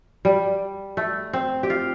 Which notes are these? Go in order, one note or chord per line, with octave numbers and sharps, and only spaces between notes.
G3
A3
C4
G4
F4